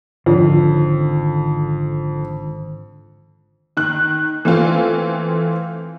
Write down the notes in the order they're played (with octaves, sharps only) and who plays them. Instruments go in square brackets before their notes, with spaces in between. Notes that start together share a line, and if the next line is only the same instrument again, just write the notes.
[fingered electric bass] G#1 D#3 [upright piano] F2 [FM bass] D3
[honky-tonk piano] D#3 F#6
E3 A3 C4 F4